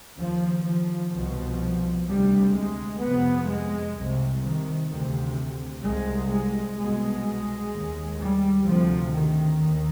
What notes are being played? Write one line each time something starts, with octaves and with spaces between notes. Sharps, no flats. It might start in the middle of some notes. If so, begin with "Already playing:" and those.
D#2 F3
F3
C2 B2
D2 C3 G3
G#3
F2 C3 B3
G#3
C2 C3
D#3
D2 C3
C2 C3 G#3
G#3
C2 B2 G#3
D#2
G3
D2 C3 F3
D#3
D#2 D#3